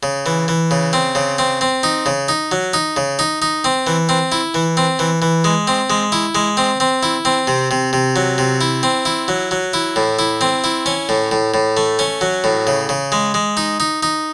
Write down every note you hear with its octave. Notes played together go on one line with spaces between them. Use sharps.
C#3
E3
E3
C#3
C4
C#3
C4
C4
D#4
C#3
D#4
F#3
D#4
C#3
D#4
D#4
C4
E3
C4
E4
E3
C4
E3
E3
G#3
C4
G#3
E4
G#3
C4
C4
E4
C4
C3
C3
C3
F#3
C3
E4
C4
E4
F#3
F#3
E4
A2
E4
C4
E4
C#4
A2
A2
A2
A3
C#4
F#3
A2
C#3
C#3
G#3
G#3
D#4
D#4
D#4